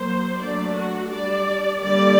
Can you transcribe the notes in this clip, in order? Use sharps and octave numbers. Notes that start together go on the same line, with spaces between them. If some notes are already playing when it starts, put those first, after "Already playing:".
Already playing: F#3 A#3 C5
F#3 A3 D4 D5
F#4
G3 D4 D5
D3 G3 A#3 D5